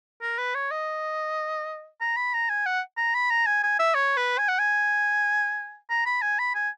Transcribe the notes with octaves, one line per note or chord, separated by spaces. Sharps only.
A#4
B4
C#5
D#5
A#5
B5
A#5
G#5
F#5
A#5
B5
A#5
G#5
G#5
E5
C#5
B4
G#5
F#5
G#5
A#5
B5
G#5
B5
G#5